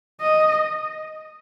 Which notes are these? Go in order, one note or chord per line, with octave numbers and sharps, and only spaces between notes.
D#5